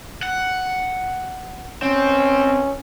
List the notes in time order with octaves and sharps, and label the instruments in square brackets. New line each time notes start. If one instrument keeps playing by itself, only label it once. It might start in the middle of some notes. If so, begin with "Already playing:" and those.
[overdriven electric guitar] F#5
[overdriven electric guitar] C4 [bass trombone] C#4